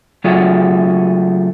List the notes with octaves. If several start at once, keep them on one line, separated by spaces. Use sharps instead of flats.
C#3 F#3 A3 F4 G#4